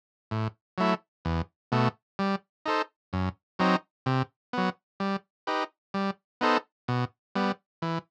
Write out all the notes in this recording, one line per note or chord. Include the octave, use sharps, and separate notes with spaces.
A2
F#3 A3 E4
E2
B2 A3
G3
D#4 A4 C5
F#2
F#3 C4 D#4
C3
F#3 B3
G3
D#4 G4 B4
G3
B3 D#4 A4 C5
B2
G3 B3
E3